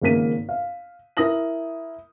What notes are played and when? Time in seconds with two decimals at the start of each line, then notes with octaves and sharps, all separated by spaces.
0.02 G#1 C#3 A#3 A#4 B6 D#7
0.49 F5
1.17 E4 A#4 D#6 A#6 F#7